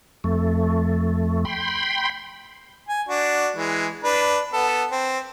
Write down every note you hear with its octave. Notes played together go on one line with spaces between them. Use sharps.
F2 A3
G5 B5 C6
G#5
D4 F#4
E3 G#3
D4 B4
B3 A4
C4